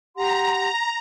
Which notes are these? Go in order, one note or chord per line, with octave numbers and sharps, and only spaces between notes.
G4 F#5 A#5 C6